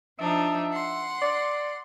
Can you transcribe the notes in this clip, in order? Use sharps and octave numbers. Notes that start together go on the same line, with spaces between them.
F3 D4 D#4 E5
F#5 C6
D5